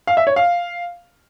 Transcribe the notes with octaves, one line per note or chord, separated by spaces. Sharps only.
F5
E5
C#5
F5